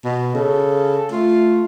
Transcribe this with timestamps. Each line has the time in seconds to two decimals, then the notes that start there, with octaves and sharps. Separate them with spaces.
0.04 B2
0.35 C#3 A4
1.12 A3 F4